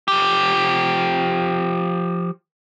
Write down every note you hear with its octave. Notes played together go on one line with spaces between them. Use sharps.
F3 G4